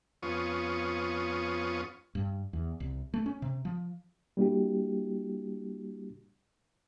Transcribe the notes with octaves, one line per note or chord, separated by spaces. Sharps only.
F2 B3 C#4 F4 C#6 D#6
G2
E2
C2
A3
C#4
C3
F3
G3 A#3 D4 E4 F#4 G4